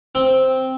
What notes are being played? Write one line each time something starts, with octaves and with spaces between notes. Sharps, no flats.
C4